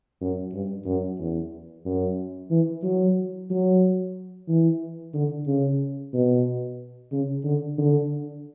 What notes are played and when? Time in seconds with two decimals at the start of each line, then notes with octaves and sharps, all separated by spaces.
0.21 F#2
0.54 G2
0.86 F#2
1.19 E2
1.85 F#2
2.51 E3
2.83 F#3
3.50 F#3
4.48 E3
5.14 D3
5.47 C#3
6.14 B2
7.12 C#3
7.44 D3
7.78 D3